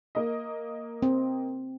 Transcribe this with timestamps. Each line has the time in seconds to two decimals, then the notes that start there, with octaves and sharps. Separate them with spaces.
0.15 A#3 D#5
1.02 C4